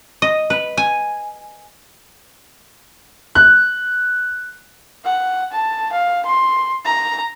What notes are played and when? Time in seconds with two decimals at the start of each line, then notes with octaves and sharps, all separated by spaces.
0.22 D#5
0.50 B4
0.77 G#5
3.35 F#6
5.05 F#5
5.52 A5
5.92 F5
6.25 C6
6.85 A#5